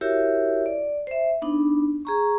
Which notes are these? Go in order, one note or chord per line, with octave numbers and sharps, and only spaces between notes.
E4 F#4 G4 A#4 C#5 E5
D5
C5 E5
B3 D4 D#4
G#4 A#5 C#6